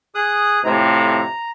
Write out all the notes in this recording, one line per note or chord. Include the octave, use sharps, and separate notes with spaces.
G#4 D#6 F#6
F2 A2 C3 A#5